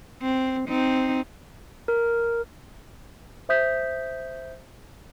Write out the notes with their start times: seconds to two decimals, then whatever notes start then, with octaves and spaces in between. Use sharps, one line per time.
0.21 C4
0.68 C4 D#4
1.88 A#4
3.49 C5 E5 D#6 G6 B6